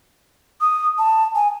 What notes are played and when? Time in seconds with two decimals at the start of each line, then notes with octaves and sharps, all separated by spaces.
0.61 D#6
0.98 A5
1.35 G#5